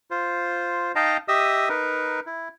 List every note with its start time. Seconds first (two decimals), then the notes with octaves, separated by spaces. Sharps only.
0.11 F4 C5
0.95 D#4 D#5 F5 G5 A5 A#5
1.28 G4 D#5 E5 D#6 E6
1.69 D#4 A#4 B4
2.26 E4